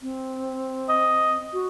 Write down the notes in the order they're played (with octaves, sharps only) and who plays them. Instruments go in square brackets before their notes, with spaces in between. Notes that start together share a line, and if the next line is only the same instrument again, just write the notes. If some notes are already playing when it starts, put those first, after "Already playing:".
[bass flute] C4
[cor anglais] D#5
[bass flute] F#4